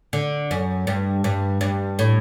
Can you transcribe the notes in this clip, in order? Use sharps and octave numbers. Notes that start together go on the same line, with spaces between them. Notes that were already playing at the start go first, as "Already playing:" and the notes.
D3
F#2
G2
G2
G2
A2